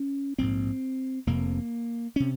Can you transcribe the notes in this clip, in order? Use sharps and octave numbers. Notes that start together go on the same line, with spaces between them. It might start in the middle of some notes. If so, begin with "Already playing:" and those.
Already playing: C#4
A#1 G#2 C4
F1 F2 C3 A#3
C3 C#4